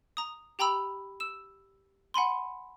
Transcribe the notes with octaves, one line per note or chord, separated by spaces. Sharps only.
A#5 D#6
G4 G5 A#5 B5 E6
E6 E7
F#5 G#5 B5 C6